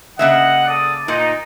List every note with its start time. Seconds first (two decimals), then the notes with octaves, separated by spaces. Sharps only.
0.19 C#3 A#3 D#5 E5 F#5
0.67 A4 D5 D#6
1.08 A#2 D#4